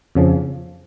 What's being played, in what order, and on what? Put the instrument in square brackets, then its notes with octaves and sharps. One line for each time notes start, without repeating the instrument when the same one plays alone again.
[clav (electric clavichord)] F2 C#3 F3